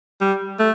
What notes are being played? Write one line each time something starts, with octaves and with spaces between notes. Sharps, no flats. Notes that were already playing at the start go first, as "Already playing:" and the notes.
G3
A3